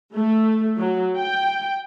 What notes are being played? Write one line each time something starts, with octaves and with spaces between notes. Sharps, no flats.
A3
F#3
G5